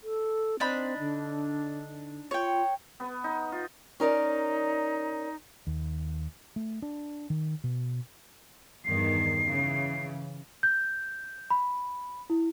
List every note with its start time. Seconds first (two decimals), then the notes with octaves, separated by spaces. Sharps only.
0.03 A4
0.60 C4 D4 D#4 B5
0.99 D3
2.31 F4 C#5 G5
3.00 B3
3.24 D#4
3.52 F4
4.00 C#4 D#4 A#4 D5
5.67 D#2
6.56 A3
6.82 D4
7.30 D#3
7.64 B2
8.85 E2 G2 D#3 C7
9.47 C#3 E3
10.63 G6
11.51 B5
12.30 E4